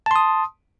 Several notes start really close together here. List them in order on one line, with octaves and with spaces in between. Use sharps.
A5 C6 D#6